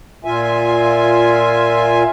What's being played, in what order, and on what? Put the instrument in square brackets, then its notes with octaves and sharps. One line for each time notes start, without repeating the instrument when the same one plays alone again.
[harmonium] A#2 F4 E5 G#5